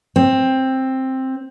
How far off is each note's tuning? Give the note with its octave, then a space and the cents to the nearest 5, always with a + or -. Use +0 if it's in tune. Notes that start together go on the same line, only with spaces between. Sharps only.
C4 +10